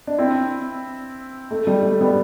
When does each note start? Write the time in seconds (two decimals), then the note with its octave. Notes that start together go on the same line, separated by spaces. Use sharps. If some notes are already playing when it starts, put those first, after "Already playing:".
0.07 D4
0.18 C4 E4
1.51 A3
1.67 G3
1.83 A3
2.01 G3 B3